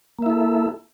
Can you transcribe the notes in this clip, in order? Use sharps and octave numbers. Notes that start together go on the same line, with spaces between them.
A#3 E4 A4 E5